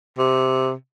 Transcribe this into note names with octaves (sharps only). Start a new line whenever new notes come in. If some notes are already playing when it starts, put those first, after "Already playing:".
C3